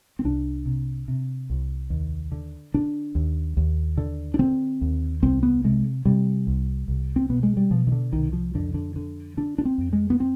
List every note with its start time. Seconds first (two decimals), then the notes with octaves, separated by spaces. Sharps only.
0.19 C4
0.24 C2 D4
0.66 C3
1.08 C3
1.50 C2
1.90 D#2
2.32 D3
2.74 D3 D4
3.15 D#2
3.57 D#2
3.97 D3
4.34 D4
4.39 D3 C4
4.81 D#2
5.22 C2 C4
5.43 B3
5.64 C3 G#3
6.05 C3 G3
6.47 C2
6.88 C2
7.16 C4
7.30 B2 B3
7.43 G#3
7.57 G3
7.71 B2 F3
7.87 D#3
7.92 D3
8.13 C2 D#3
8.33 F3
8.54 F2 D3
8.74 D3
8.96 D3
9.37 D3 D4
9.58 D4
9.65 C4
9.78 F2
9.93 G#3
10.10 B3
10.20 C4